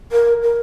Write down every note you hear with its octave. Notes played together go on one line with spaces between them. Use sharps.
A#4
A#4